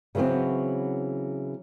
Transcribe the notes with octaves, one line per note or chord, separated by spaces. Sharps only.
C#3 E3 F#3 B3 C4